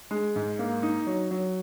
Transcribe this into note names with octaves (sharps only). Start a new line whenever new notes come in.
G#3
G#2
A#3
D#4
F#3
F#3